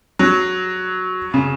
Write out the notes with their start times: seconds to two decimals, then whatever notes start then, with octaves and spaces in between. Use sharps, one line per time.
0.19 F#3
1.34 C#3